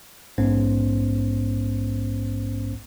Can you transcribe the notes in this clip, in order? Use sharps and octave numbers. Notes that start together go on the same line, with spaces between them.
A#1 G#2 B3 C#4 C5